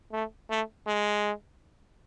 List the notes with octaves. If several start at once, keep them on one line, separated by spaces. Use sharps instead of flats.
A3
A3
G#3